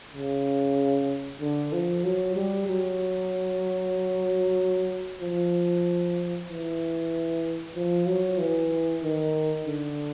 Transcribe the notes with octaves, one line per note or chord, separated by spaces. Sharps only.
C#3
D3
F3
F#3
G3
F#3
F3
E3
F3
F#3
E3
D#3
D3